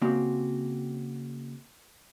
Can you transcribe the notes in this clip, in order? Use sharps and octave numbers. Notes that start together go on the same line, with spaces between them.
C#3 A#3 C4 F#4 G4